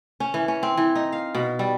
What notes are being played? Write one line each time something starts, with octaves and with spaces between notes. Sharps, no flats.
C#4
E3
C#4
C4
E3
D#4
F5
B2
G3